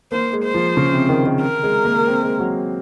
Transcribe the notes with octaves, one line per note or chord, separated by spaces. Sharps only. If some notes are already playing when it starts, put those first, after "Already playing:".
A#3 C5
G#3
C5
F3
C#3
C3
D#3
D#3
A#4
G#3
A#3
C4
G#3
F#3